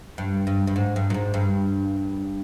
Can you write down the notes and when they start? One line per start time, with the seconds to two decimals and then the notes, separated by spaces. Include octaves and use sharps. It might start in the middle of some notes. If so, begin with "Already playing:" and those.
0.18 G2
0.47 G2
0.67 G2
0.76 G#2
0.96 G2
1.10 A#2
1.14 G#2
1.34 G2